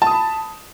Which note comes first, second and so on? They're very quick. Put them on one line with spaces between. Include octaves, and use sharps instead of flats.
A5 D#6 B5